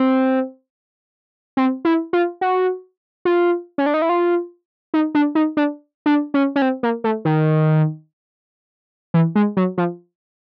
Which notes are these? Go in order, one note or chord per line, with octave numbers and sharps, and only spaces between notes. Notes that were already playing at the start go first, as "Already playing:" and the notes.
Already playing: C4
C4
E4
F4
F#4
F4
C#4
D4
D#4
E4
F4
D#4
D4
D#4
D4
D4
C#4
C#4
C4
A#3
A3
D#3
E3
G#3
F#3
F3